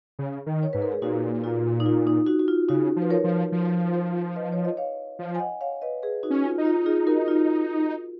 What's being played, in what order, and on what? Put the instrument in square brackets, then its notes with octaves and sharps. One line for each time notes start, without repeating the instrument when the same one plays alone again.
[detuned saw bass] C#3
D#3
[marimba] C#5
[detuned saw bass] G#2 [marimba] B4
[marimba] A#4
G#4
[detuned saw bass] A#2 [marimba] D#4 F#4
[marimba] F4
D#4
F4
D#4
D#4 F#4
F#4
F4
[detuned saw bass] C#3 [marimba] D#4 F#4
[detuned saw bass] F3
[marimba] B4
A#4 C#5
[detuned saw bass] F3
F3
[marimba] B4 D#5
C#5
D#5
C#5 F5
[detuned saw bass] F3
[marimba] G#5
D#5 F#5
C#5 F5
B4 D#5
G#4 B4
D#4 F#4
[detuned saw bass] C#4
[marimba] F4
[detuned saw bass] D#4
[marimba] F4
F4 G#4
F#4 A#4
F4